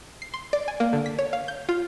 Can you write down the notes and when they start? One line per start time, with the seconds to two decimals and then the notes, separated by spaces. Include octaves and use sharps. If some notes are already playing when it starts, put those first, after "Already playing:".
0.22 C7
0.34 C6
0.53 D5
0.68 G#5
0.80 A#3
0.93 D3
1.06 B6
1.19 C#5
1.33 F5
1.48 G6
1.69 F4